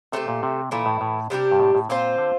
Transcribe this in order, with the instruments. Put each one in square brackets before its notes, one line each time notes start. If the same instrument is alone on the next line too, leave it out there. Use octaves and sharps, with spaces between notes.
[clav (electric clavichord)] C3 [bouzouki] A3 D4 G4 C5
[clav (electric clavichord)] A#2
C3
[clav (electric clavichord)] A#2 [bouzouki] E3 A3 E4
[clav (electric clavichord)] A2
A2
[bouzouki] C3 G3 D4 G4
[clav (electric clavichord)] G2
A2
A2
[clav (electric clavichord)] A#2 [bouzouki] C4 F4 C5
[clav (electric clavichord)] D3